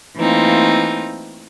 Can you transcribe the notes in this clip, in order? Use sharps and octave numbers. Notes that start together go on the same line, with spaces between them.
E3 A3 A#3 C4 D#4 F4